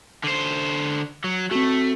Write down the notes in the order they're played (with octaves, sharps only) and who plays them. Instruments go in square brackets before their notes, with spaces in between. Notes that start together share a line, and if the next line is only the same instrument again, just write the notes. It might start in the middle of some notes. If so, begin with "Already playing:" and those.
[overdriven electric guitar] D3 C5
F#3
[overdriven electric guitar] A3 [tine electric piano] C4 F#4